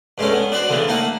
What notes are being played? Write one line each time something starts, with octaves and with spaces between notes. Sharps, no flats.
G2 G#3 A3 C#4
B3
D4 F#4 B4 C5
D2 C#3 E3 B3
A3 A#3 D#4 F#5